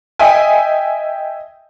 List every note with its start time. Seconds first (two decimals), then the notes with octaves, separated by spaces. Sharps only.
0.19 D#5 E5 G5 G#5